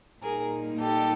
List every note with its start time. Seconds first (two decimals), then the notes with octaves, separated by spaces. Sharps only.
0.22 A#2 G3 A#3 D#4 G#4 A#4
0.80 G4 A4